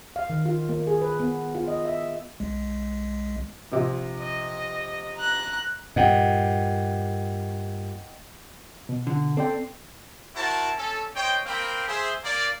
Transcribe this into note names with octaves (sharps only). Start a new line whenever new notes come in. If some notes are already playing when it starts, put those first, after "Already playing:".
F5
D#3
F4
A#3
G#4
B4
B3
F4
D#5
E5
B1 G#3
A#1 C3
D#5
A#5 F#6
G2 A#2 D#5 F#5 G5
B2
D3
C4 A4 D5 G5
E4 F#4 A#4 C5 A5
C#4 A4
C5 C#5 D#5 G5
A#3 C4 A#4 F5 G5 B5
G#4 C5 E5
A#3 D5